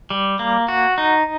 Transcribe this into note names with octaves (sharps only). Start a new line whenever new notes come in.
G3
A#3
F#4
D#4